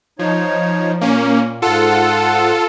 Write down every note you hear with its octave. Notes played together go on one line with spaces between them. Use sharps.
F3 D#4 C#5
A#2 A#3 C#4
G#2 F4 A4 F#5